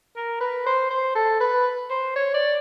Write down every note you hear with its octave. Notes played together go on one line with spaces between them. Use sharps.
A#4
B4
C5
C5
A4
B4
C5
C#5
D5